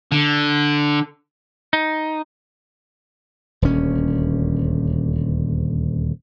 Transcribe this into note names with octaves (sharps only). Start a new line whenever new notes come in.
D3
D#4
D#1 D2 C#4